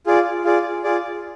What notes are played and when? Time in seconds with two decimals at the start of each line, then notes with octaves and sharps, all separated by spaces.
0.06 F4 G#4 D5
0.44 F4 G#4 D5
0.84 F4 G#4 D5